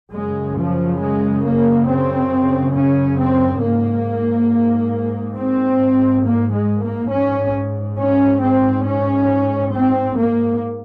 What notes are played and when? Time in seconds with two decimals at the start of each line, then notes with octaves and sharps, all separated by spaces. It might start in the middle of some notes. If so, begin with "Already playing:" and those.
0.12 F#2 C#3 G#3
0.56 F3
0.99 G#3
1.44 A#3
1.87 C4
2.74 C#4
3.17 C4
3.61 G#2 A#3
5.36 C4
6.24 A#3
6.53 G#3
6.82 A#3
7.11 G#2 C#4
7.98 C#4
8.42 C4
8.86 C#4
9.74 C4
10.17 A#3